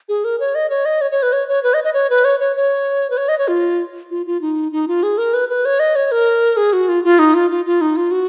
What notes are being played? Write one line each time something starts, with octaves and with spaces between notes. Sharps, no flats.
G#4
A#4
C#5
D#5
C#5
D#5
C#5
C#5
B4
C#5
C#5
B4
D#5
D#5
C#5
B4
C#5
C#5
C#5
B4
C#5
D#5
C#5
F4
F4
F4
D#4
D#4
F4
G#4
A#4
B4
B4
C#5
D#5
C#5
A#4
G#4
F#4
F4
F4
D#4
F4
F4
F4
D#4
F4
F#4